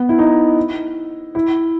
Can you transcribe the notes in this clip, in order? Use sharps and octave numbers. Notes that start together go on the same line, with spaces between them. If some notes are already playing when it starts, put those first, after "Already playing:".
Already playing: B3
E4
D#4
E4